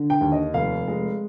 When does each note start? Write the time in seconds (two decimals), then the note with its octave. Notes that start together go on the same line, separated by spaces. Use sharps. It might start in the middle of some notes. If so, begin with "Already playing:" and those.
Already playing: D3
0.10 G5
0.21 D#2
0.32 D#5
0.54 F1 F5
0.88 G#3